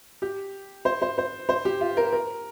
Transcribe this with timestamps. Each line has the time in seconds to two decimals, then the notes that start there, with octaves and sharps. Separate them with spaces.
0.22 G4
0.85 C5
1.02 C5
1.18 C5
1.49 C5
1.65 G4
1.81 F4
1.97 A#4
2.13 A#4